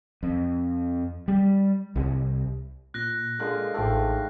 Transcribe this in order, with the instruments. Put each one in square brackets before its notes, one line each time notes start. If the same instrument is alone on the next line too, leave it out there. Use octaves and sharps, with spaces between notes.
[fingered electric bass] F2
G3
C2
[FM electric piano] A#2 [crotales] F#6 A#6
[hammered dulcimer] D3 F4 A#4 [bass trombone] G#3
[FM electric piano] A1 A4 [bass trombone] G#2 [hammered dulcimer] A3 F4 G4